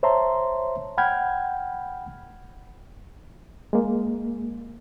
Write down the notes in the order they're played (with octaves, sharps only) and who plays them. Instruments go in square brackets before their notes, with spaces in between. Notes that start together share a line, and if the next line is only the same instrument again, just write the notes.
[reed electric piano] C5 C#5 E5 A5 A#5 C6
F#5 G5 B5 F6 G6 G#6
G#3 A#3